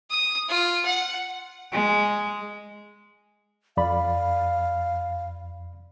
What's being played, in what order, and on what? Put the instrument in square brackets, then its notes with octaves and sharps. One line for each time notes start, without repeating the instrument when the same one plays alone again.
[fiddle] D#6
F4
F#5
[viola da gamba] G#3
[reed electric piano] F2 D5 B5 [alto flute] F5